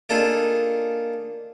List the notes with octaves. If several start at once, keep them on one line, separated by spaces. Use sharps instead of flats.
A#3 D4 D#4 F4 G#4 A4